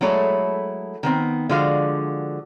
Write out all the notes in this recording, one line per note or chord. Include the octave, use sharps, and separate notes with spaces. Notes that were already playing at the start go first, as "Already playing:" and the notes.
F#3 G#3 A3 E4 A4 C#5
D#3 B3 C4
D3 F3 G#3 F#4 F5